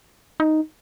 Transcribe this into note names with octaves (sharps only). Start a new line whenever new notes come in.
D#4